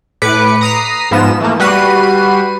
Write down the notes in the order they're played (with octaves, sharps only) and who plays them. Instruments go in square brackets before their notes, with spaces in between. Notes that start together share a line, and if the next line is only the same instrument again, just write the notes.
[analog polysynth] A2 B4 D6 C#7
A#5 D#6 B6 C7
G#2 F3 B3 E7
E3 A3 A#3
G3 F#4 B4 C7 D#7